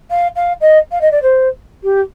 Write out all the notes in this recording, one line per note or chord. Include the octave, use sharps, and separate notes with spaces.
F5
F5
D#5
F5
D#5
D5
C5
G4